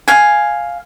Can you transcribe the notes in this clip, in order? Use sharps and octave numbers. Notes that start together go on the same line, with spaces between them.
F5 G#5